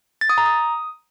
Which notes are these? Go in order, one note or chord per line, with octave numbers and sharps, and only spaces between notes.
A6
D#6
A#5
D#6